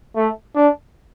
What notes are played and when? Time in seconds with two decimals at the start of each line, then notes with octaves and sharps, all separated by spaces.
0.16 A3
0.56 D4